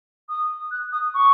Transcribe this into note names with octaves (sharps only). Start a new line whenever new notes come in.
D#6
F#6
D#6
C#6